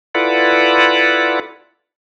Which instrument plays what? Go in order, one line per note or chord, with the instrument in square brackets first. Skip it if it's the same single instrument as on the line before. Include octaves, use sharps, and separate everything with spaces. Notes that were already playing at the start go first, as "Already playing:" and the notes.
[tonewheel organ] E4 F4 A4 B4 D5 F#5